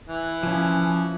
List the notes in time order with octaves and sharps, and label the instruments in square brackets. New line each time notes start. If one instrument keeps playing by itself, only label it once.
[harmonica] E3
[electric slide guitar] F3 C#4